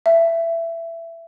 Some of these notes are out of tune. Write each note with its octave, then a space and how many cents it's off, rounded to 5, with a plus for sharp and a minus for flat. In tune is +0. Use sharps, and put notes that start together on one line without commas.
E5 +15